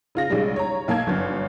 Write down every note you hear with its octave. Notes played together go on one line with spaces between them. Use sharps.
C#3 F4 A#6
B1 C#3 G3 G#3
C#5 A#5
B1 A#3 A5 G#6
G1 F#2